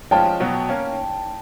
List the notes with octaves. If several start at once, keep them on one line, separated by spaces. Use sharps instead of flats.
F3 G#3 C#4 F4 G5 A5
B2 F#3 B3
A#3 C#4